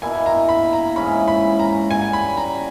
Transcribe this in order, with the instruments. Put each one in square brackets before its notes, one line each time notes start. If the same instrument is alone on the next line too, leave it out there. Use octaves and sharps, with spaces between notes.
[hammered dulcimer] B2 A#3 E4 [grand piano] G#5
[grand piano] A#5
B5
A#5
[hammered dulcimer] G#2 E3 G#3 C#4 [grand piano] B5
[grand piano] B5
A#5
[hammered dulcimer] C#3 G3 B3 [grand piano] G#5
[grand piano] B5
A#5